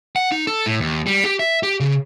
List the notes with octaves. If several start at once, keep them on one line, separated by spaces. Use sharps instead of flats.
F#5
D#4
A4
A2
D#2
G3
G4
E5
G4
C#3